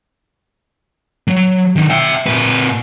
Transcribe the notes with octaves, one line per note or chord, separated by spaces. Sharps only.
F#3
D3 D#3
E5 G5
A#2 B4